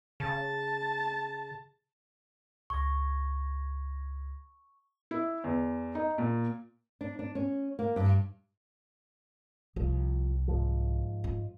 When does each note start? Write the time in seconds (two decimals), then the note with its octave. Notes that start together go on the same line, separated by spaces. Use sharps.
0.20 C#3 A5
2.70 C#2 C#6 G#6 A#6
5.11 E4
5.44 E2
5.95 D#4
6.18 A#2
7.01 D4
7.19 D4
7.35 C#4
7.79 A#3
7.96 G2
9.76 C2 F3
10.48 G#2 F3
11.24 F4